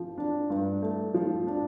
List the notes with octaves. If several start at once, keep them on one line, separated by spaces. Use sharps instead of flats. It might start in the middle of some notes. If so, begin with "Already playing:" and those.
Already playing: F3
D4
G2
A3
F3
D4